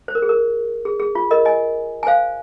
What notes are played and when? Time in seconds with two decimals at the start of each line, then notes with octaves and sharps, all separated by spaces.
0.08 C5
0.15 A#4
0.22 G#4
0.29 A#4
0.85 G#4
1.00 G#4
1.15 F4
1.31 A#4 D#5
1.45 D#5 G#5
2.03 G#5
2.07 C5 F5